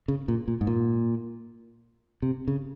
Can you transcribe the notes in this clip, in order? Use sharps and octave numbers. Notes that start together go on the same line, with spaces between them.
C#3
A#2
A#2
G#2
A#2
C3
C#3